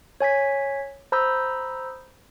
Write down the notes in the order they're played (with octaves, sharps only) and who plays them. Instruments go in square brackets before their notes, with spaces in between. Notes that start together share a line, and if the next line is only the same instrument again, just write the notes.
[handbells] C#5 G#5 G#6 B6
C5 A#5 B5 D#6 E6 G6